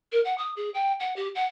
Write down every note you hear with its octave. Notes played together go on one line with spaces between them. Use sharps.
A#4
F#5
D#6
G#4
G5
F#5
G4
F#5